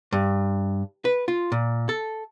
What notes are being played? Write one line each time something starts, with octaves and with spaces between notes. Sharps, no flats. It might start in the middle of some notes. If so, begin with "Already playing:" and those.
G2
B4
F4
A#2
A4